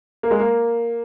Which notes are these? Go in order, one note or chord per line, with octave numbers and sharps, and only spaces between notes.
A#3
G#3
A#3